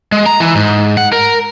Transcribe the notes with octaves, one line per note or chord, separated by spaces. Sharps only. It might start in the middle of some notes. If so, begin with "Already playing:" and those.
G#3
A#5
E3
G#2
F#5
A#4